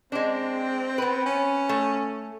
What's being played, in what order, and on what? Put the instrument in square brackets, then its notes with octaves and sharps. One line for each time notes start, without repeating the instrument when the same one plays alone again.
[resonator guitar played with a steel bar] G#3 D4 [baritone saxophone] C4
[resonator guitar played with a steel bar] B3 B4
[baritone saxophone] C#4
[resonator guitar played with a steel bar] A3